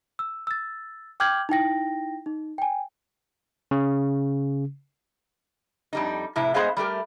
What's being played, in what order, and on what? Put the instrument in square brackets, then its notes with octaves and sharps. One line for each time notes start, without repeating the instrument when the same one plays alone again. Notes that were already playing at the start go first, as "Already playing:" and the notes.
[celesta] E6
E6 A6
G5 D6 F6 G6 G#6 F#7
D#4 E4 G5 A#6
D#4
G5 G#5
[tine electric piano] C#3
[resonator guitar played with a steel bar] F2 G3 D#4
F2 A2 C3 E4
G#3 B3 G#4 C5 D#5 F5
G3 A3 G4 A#4